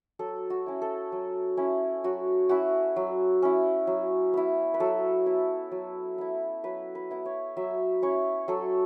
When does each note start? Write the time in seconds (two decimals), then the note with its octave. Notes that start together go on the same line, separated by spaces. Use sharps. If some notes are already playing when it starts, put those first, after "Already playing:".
0.19 F#3 A4
0.50 F#4
0.66 C#4 E4
0.82 A4
1.12 F#3
1.57 C#4 E4
2.04 F#3 F#4
2.49 C#4 E4 F#4
2.96 F#3
3.42 C#4 E4
3.87 F#3
4.34 B3 E4
4.74 B4
4.80 F#3 A4
5.26 B3 E4
5.72 F#3
6.18 B3 E4
6.64 F#3 B4
6.95 B4
7.11 B3 E4
7.26 C#5
7.57 F#3 E5
8.02 C#4 E4 C#5
8.48 F#3 A4